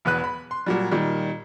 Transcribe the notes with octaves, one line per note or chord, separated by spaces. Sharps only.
E1 E2 B4 F#6
B5
C6
A#2 F#3 G3
A#2 D#3 G3